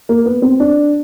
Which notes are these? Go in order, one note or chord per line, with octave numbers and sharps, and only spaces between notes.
A#3
B3
C4
D4